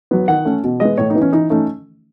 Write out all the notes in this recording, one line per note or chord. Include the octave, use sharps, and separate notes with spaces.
F#3 B3
D#3 F#5
A3 C#4
B2
G#3 B3 D#5
A2 C#5
D#4
E3 B3
C#4
E3 D#4
A3 C#4 D#4